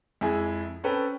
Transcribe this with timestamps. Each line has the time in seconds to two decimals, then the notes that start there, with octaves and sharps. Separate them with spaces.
0.21 F2 G#3 E4 G#4 G#5
0.84 C4 C#4 A4 B4 G5